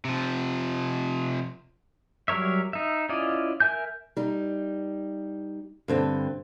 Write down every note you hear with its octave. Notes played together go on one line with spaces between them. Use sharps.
C3 F3
F#3 G3 A#4 C#5 E5
D#4 E5
C#4 E4 F4 D5 D#5
A#4 E5 G#5 G6
G3 D#4
G2 D3 C4